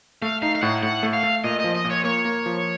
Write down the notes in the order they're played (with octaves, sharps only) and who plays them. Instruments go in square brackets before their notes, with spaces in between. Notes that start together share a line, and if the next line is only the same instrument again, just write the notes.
[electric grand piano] A3 [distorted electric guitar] F5
[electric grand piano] D#4 [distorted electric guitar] F5
[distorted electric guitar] F5
[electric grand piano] A2 [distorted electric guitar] F#5
[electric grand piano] A2 [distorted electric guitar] F#5
[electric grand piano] A3
[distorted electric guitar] F5
[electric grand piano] A3
[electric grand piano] A#2 [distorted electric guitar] D#5
[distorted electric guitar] D#5
[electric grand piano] F3
[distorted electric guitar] D#5
[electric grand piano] A#2
[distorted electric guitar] C#5
[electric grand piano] A#3 [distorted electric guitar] C#5
[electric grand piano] A#3
F3